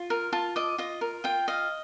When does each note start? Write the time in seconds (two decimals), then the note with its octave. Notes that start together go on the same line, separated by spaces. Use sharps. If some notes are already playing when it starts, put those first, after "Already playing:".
Already playing: F4
0.10 A#4
0.33 F4 A5
0.56 D#5 D6
0.78 F4 D#5
1.01 A#4
1.24 F4 G5
1.48 D#5 F5